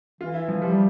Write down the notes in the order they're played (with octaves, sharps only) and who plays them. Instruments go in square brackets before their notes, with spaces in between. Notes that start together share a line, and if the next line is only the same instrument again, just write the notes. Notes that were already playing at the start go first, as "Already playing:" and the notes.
[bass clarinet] E3 [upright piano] F4
[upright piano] E4
F3
[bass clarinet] F3 [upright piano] G3
[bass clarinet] G3